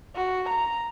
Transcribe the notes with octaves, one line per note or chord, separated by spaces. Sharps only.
F#4
A#5